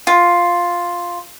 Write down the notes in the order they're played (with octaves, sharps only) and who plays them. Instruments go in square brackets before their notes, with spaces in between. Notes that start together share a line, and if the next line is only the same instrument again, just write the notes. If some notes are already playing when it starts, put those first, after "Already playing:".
[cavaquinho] F4